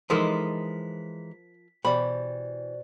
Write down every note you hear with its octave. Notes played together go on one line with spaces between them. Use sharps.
E3 F3 G#3 D#4 A4 A#4 C5 B6
B2 E3 G4 C5 D5 B5